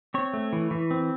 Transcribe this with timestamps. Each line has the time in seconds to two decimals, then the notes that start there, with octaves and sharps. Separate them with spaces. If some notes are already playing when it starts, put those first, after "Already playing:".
0.14 C4 C#5
0.33 A3
0.53 E3
0.71 E3
0.91 C4